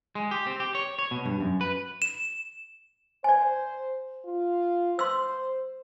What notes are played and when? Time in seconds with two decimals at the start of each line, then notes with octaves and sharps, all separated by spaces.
0.15 G#3
0.31 G4
0.47 C4
0.60 G4
0.75 C#5
0.99 C#5
1.11 B2
1.26 G2
1.40 F#2
1.61 B4
2.02 E7
3.24 C5 D5 G#5
4.25 F4
4.99 C5 C6 E6